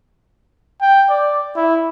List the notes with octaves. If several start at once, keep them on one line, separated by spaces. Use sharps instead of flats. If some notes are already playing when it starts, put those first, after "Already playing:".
G5
D5
E4